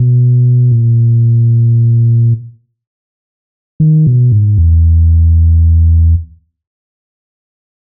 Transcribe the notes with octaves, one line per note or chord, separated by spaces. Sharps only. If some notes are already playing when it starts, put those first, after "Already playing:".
Already playing: B2
A#2
D#3
B2
G#2
E2